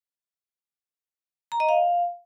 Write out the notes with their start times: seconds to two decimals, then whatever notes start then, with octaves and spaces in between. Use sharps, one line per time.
1.52 A#5
1.60 D#5
1.69 F5